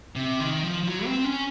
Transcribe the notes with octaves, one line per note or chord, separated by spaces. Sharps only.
C3
D#3
F3
F3
F#3
C4
C#4